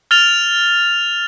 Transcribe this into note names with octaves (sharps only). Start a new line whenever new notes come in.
F6 A6 F7